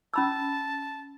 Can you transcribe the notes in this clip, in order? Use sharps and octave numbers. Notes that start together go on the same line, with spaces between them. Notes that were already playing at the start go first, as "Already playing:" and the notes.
C#4 A5 B5 E6